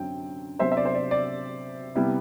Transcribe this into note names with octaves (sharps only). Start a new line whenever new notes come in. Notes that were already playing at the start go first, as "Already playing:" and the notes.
Already playing: F#2 D3 F#3 C4 G5
C3 F#3 B3 D4 C5 E5
E5
D5
C5
D5
D5
C3 G3 B3 E4